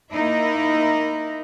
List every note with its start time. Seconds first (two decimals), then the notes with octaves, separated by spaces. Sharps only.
0.12 A#3 D#4 E4 A#4